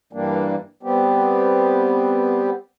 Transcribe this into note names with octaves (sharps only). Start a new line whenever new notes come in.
G2 E3 G3 A#3 D4
G3 B3 C4 G4